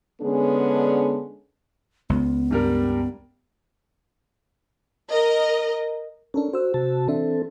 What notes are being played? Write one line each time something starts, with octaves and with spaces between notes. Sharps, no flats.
D3 G#3 B3 C#4 D4 G#4
C#2 B3
G2 G3 A#4
A#4 D#5
C#4 D4 A4 A#4
F#4 C5 E6
C3 F#4 A5
E3 C4 D4 A4 E5